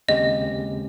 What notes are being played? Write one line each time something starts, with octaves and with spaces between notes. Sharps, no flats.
D#2 C#3 G#3 C4 G4 D#5